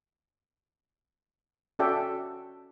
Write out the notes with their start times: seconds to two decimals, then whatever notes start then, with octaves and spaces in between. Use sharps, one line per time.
1.79 C#4 F#4 A4 D5 E5 G5